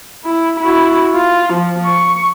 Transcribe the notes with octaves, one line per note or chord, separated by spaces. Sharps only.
E4
E4 F#4
F4
F3
C#6